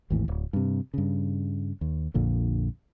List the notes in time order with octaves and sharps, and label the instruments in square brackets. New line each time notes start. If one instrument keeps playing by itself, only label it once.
[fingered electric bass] G#1 D#2 A2 E3
D1
G2 C3
G2 C#3
D#2
A#1 F2 A#2 D3